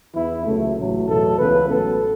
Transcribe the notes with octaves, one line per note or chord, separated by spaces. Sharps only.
E2 E3 B3 E4
C#2 C#3 F#3 A3
A1 A2 F#3 A3
E2 B2 F#3 A3 A4
C#2 C#3 E3 B3 B4
A1 A2 F#3 B3 A4